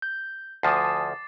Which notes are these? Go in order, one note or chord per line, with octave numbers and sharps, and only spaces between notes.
G6
D2 F3 G#5 A5 D6 D#6 A6 C7